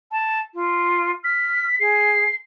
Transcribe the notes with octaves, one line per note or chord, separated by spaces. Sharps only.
A5
F4
F6 B6
G#4 C7